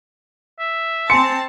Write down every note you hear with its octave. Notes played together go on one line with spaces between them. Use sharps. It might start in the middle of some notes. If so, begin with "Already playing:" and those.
E5
C4 G#5 A5 C6 C#7